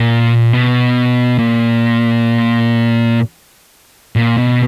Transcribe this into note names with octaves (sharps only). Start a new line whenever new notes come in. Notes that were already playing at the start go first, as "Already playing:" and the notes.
Already playing: A#2
B2
A#2
A#2
B2